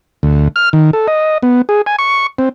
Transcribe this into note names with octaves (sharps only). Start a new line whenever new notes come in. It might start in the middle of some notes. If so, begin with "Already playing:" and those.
D2
F6
D#3
A4
D#5
B3
G#4
G#5
C#6
C4